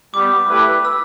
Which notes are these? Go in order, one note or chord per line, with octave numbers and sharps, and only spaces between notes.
G3 B3 G4 D6
A3 E4 G4 B4
E6